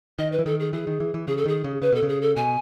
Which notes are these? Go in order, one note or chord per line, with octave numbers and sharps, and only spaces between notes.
D#3 D#5
B4
E3
D#3 A4
G#4
E3 G#4
D#3
E3
E3
C#3 G#4
A4
D#3 G#4
C#3
C#3 B4
B2 A4
C#3
G#4
A4
B2 G#5